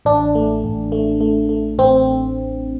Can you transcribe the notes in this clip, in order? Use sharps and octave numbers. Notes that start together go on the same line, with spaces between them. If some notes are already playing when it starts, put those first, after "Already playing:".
A1 D4
A3
A1
A3
A3
A3
A1 C4